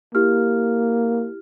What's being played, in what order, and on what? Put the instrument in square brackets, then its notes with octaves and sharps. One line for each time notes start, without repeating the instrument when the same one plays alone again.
[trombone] A#3 [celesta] E4 G4 F6